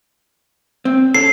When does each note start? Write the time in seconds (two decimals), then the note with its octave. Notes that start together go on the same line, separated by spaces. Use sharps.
0.85 C4
1.15 C#4 A4 C7